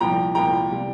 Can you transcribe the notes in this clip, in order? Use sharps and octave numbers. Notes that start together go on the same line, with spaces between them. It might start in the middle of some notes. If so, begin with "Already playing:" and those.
C2 A#2 F3 G5 A#5
C2 A#2 F3 G5 A#5
C3 E3 G3